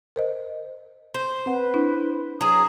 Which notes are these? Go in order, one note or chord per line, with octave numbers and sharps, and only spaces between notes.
A#4 C5 D#5
C5
C4 B4 F#5
D4 E4
F#3 G#4 D#6